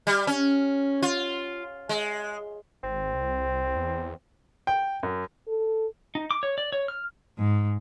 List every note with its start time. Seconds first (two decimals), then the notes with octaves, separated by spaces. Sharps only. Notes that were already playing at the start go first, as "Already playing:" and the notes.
0.07 G3
0.27 C#4
1.02 F4
1.89 G#3
2.84 G#1 C4
3.14 C2
3.76 E2
4.67 G5
5.03 F#2
5.48 A4
6.15 D#4
6.31 D6
6.43 C#5
6.58 D5
6.72 C#5
6.88 F6
7.38 G#2